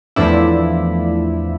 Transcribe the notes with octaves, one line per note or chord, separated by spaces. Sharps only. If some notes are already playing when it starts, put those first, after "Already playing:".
E2 A2 F3 D4 E4